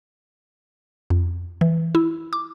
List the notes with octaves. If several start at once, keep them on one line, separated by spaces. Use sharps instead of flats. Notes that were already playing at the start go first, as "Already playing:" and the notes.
F2
E3
E4
D6